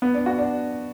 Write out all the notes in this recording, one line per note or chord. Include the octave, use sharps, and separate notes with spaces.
B3
D4
F#4
D4